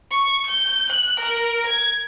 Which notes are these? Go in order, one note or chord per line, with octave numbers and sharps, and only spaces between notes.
C#6
G6
F#6
A#4
G#6